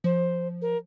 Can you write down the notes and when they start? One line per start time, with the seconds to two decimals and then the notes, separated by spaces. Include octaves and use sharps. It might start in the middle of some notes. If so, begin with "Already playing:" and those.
0.04 F3 C5
0.62 A#4